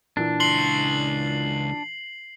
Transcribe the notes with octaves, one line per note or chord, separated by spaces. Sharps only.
A#2 E3 D4
C#2 C6 C7 F#7